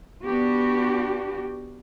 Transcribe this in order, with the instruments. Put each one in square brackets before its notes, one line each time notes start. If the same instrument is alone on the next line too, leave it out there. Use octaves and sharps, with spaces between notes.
[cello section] B3 D4 F#4 G4